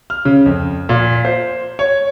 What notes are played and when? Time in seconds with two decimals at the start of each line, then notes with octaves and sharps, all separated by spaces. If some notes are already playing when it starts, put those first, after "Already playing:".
0.10 F6
0.25 C#3
0.46 F2
0.89 A#2
1.25 C5
1.79 C#5